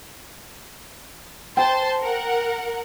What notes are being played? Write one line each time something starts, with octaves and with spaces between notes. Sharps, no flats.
C5 G5 A5 C6
A#4 F#5